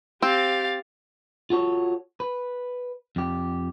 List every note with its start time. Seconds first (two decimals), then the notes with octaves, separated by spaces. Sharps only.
0.22 C4 G4 F5 A6
1.50 F4 F#4 A4 C#5
2.20 B4
3.16 F2 G4